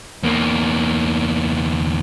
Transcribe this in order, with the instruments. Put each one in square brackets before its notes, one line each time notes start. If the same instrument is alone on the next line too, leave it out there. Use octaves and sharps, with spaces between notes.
[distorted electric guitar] E2 A#3